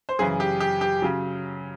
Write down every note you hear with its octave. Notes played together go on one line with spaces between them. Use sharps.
C5
F#2 C#3 E3 G#4
G4
G4
G4
C#3 F#3